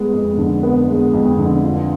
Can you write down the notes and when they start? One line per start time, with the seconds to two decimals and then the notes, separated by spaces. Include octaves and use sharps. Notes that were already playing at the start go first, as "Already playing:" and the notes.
Already playing: G#3 B3
0.13 F2
0.38 D3
0.63 B3
0.88 G#3
1.14 F2
1.38 D3
1.64 F4